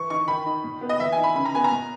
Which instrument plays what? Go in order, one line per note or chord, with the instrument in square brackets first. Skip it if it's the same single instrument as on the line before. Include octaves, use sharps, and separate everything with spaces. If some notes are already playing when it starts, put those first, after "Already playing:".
Already playing: [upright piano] E3 C#6
D#4 C#6
D#3 B5
D#4
A#2
B3
D#5
E3 E5
G#5
D#4
B5
C#3 B5
A#5
B3 G#5
A#5
A#2